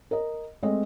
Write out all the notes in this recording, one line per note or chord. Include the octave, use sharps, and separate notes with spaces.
A#4 D#5
G#3 A3 C4 D#5